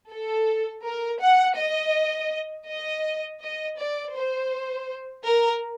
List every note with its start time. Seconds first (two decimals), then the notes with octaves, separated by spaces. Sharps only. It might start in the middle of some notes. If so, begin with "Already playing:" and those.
0.12 A4
0.86 A#4
1.22 F#5
1.58 D#5
2.68 D#5
3.41 D#5
3.78 D5
4.14 C5
5.25 A#4